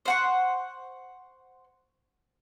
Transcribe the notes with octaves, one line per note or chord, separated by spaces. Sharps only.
C5 F#5 C#6